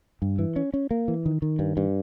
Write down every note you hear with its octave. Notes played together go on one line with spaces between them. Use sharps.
G2
E3
C#4
C#4
A#3
E3
D#3
D#3
G2
G2